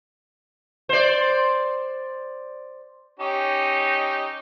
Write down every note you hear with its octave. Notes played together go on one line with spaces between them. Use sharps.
C5 D5
C#4 D#4 G4